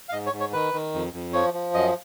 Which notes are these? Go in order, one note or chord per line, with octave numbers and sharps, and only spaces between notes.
F5
G#2 D#5
C#5
G#2
C#5
D#3 B4
D#3
F2
F2
F3 C#5
F3
F#2 D#5